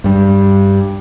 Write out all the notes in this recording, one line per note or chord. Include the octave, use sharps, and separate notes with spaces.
G2 G3